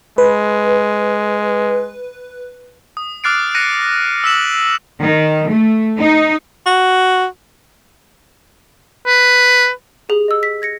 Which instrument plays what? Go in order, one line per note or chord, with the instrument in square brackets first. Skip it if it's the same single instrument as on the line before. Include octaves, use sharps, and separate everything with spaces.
[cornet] G#3 [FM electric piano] B4
[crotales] D#6
D6 F6 F#6 A6 C7 D7
F#6 A#6 C#7 D#7
E6 B6 E7 F#7
[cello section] D#3
A3
D#4
[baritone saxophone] F#4
[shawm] B4
[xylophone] G4 G#4 F#7
D#5 E6
B6
G#6 A#6 C#7